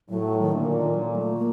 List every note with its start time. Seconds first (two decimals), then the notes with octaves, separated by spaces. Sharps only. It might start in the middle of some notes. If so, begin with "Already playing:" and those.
0.09 A2 F#3
0.41 D#3
0.52 A#2 D3
0.73 D#3
0.94 F#3
1.15 A3
1.37 A#3